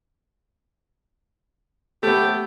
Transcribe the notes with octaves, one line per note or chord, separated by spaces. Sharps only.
A3 B3 G4